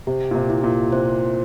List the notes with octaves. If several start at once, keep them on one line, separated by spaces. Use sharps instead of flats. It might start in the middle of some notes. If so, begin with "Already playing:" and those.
C3 G4
A#2
C3
E4
A#2
C3 C5